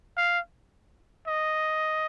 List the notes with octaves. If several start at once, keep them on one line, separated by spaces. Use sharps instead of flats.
F5
D#5